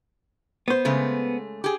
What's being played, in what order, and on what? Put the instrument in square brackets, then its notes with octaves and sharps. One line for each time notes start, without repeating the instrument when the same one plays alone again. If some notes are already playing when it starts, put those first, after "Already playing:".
[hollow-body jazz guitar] B3 C5
[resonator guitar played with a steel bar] C#3 G#3 A3
G4 G#4